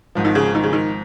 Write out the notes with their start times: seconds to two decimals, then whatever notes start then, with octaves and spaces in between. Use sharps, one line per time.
0.15 G#1 G#2 F3
0.25 D#3
0.35 C#3
0.55 D#3
0.63 C#3
0.73 D#3